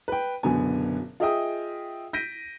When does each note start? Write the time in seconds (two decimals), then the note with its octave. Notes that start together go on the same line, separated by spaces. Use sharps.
0.08 B4 G5
0.43 F#1 B2 D3 B3 G#5
1.20 F4 G#4 D#5 E5 G5 D#6
2.13 G6 A#6 B6 D7 D#7